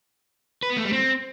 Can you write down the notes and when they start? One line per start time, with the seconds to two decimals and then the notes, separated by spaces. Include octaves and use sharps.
0.63 B4
0.70 B3
0.78 A3
0.85 G3
0.93 C4